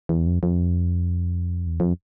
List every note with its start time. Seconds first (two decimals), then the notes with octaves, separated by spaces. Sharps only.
0.09 E2
0.26 F2
0.43 F2
1.67 E2
1.80 F2